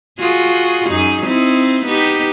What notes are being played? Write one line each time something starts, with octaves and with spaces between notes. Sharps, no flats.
F4 F#4 G#4
F#2 D#4 G#4
C4 D#4 E4
B3 D#4 G4